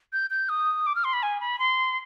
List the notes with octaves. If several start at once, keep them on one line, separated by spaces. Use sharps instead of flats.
G6
G6
D#6
D6
F6
C6
B5
G#5
B5
C6